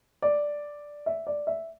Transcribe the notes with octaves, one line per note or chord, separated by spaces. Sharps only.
D5
E5
D5
E5